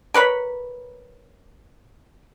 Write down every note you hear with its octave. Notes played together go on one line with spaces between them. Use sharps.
A#4 B4 C#5 B5